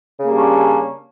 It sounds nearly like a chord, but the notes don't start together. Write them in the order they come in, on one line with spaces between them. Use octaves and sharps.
C#3 A#3 G3 D4 C#4